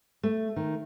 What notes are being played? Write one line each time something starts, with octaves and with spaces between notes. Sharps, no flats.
A3
D#3